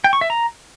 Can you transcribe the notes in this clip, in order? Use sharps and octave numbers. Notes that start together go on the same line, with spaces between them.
G5
C#6
E5
A#5